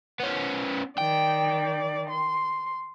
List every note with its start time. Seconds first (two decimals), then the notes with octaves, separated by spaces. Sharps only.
0.20 B3 C#4
0.98 D#3 D5 G5
2.10 C6